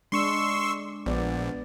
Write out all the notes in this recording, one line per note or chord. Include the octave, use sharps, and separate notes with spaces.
G#3 D4 C6 C#6 E6
A#1 B3 D5